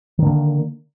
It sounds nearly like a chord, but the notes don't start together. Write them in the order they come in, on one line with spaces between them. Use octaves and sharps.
D#3 D3 A#3